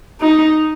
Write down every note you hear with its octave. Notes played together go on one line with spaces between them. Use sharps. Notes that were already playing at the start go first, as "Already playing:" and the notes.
D#4